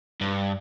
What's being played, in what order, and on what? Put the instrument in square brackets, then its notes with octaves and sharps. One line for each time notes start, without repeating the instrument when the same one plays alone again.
[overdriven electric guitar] G2